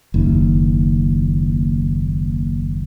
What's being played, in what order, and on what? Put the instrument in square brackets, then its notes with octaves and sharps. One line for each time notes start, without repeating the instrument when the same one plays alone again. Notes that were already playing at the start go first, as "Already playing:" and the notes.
[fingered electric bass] F#1 D#2